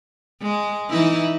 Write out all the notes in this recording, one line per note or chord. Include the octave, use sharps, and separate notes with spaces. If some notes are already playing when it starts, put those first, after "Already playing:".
G#3
E3 D#4 E4